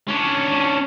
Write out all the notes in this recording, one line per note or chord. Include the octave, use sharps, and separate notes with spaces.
C#4 D4